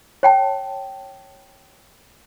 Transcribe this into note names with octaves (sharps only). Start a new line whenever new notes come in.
C#5 G5 A5